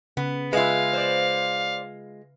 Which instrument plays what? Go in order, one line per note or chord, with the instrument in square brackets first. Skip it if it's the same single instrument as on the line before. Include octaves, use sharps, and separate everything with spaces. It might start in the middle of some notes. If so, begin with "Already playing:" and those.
[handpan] C#3 [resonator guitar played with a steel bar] B3
[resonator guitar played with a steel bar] G#3 F4 [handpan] B4 E5 [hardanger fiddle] F5
[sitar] C5 D5